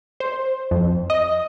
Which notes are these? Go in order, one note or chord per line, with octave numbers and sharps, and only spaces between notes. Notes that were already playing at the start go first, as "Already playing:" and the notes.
C5
F2
D#5